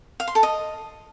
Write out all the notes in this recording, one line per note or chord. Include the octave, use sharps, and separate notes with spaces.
F5
C6
A4
D#5